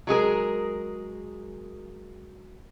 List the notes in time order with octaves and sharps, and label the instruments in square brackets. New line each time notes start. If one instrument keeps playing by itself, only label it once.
[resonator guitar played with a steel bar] F#3 G#3 G#4 A#4